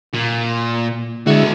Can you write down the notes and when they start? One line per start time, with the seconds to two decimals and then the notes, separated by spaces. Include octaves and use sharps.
0.14 A#2
1.27 D3 G#3 E4 F#4 A4